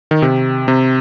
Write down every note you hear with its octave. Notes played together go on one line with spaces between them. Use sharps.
D#3
C3
C3